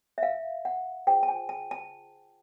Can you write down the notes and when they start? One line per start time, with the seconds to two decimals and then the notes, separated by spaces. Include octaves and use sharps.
0.18 E5
0.23 F5
0.65 F#5
1.07 F4 G#4 C5 G5
1.23 A5
1.28 G#5
1.49 A5
1.71 A5